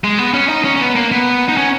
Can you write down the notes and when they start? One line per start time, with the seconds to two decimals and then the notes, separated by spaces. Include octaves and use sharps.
0.04 G#3
0.18 B3
0.34 C#4
0.49 D#4
0.64 C#4
0.76 C#4
0.80 B3
0.96 A#3
1.12 B3
1.48 D#4
1.57 C#4